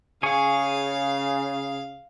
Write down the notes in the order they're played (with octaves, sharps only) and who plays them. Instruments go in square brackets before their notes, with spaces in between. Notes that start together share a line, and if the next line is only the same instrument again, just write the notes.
[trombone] C#3 [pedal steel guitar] G#4 G#5 C#6 [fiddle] F5